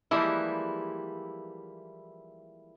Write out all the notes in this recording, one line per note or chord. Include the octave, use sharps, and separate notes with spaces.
E3 F3 G3 G#3 A#3 E4